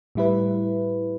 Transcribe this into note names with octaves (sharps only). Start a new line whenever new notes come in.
A2 G3 E4 B4